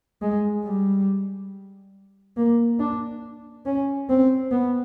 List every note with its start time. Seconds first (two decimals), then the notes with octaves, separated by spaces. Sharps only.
0.22 G#3
0.65 G3
2.37 A#3
2.79 D4
3.66 C#4
4.09 C4
4.51 B3